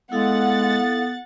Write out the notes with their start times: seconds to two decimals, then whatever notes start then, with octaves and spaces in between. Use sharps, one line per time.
0.12 G#3 B3 E4 A4 F5 F#5 A6